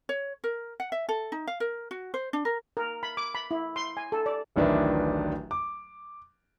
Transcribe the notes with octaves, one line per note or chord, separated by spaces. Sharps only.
C#5
A#4
F#5
E5
A4
D#4
F5
A#4
F#4
C5
D4
A#4
A#4
B5
D6
B5
E4
C6
G#5
A4
D5
D1 A1 D#3 D4 B4 E5
D6